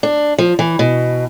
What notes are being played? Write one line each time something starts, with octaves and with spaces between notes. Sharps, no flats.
D4
F3
E3
B2